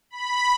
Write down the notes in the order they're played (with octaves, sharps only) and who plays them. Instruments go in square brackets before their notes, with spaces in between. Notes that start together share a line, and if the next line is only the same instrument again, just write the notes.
[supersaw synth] B5